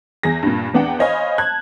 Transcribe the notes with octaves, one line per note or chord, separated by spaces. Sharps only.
E2 G#4 A#6
G2 A#2
E2 B3 D4 F#5 G5
C5 C#5 D#5 F5 G#5 B5
A5 F#6 G#6